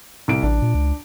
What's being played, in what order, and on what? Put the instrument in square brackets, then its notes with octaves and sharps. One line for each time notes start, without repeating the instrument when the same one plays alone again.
[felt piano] C2 D7
[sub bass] A1 [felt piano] D4
[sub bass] A#2
C#2